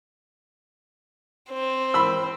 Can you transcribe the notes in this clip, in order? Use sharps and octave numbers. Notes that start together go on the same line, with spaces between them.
C4
B5 E6